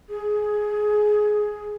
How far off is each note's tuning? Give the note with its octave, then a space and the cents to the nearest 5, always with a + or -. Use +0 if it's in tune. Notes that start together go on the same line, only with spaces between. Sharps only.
G#4 +15